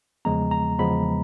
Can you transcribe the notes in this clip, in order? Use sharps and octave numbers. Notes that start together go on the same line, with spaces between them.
E2 C#3 F3 G#3 B3 A#5
A#5
E2 C#3 F3 G#3 B3 B5